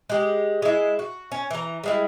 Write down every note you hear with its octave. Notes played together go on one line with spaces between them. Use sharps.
G#3 G4
G#3 E4
F#4
C#4
E3 A#5
G3 G#3 E4